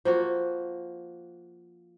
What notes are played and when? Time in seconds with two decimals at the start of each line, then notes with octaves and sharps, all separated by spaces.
0.05 F3 A#3 F#4